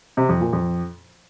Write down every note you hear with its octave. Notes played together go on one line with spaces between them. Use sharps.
C3
F2
A#2
F2